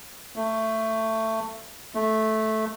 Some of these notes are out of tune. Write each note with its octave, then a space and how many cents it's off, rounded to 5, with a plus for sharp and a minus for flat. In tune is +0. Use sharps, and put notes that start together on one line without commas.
A3 +15
A3 -10